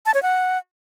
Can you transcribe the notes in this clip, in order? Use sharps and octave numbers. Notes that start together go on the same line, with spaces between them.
A5
C#5
F#5